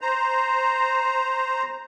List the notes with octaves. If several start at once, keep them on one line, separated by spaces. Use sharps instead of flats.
C5 A#5